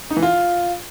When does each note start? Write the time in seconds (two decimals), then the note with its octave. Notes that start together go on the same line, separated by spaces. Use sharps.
0.11 D#4
0.17 E3
0.23 F4